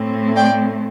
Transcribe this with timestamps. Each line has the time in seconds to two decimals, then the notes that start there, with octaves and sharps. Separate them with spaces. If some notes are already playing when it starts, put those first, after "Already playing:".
Already playing: A2 A3 C4
0.35 D5 G5